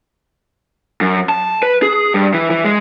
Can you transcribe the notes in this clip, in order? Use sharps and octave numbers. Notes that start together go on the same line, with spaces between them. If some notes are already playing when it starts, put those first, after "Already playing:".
F#2
A5
B4
G#4
G2
E3
E3
G#3